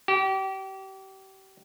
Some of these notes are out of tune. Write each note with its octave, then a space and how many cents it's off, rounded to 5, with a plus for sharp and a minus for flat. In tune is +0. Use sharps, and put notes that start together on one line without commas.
G4 -30